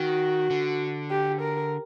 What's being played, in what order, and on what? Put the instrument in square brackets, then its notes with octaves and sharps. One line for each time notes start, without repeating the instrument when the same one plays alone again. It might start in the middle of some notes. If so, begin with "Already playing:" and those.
Already playing: [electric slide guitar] D#3 [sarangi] F#4
[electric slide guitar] D3
[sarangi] G4
A#4